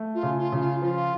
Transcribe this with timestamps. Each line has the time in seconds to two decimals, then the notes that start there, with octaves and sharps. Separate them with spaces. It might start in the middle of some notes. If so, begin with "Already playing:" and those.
Already playing: A3
0.15 F4
0.23 C#3
0.38 F4
0.52 C#3
0.60 F4
0.82 F3 F4